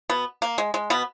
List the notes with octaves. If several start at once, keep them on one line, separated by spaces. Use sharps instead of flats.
B2 B3
A#3
G#3
G#3
B2 B3